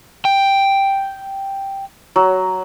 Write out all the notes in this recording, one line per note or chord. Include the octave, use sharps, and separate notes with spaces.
G5
F#3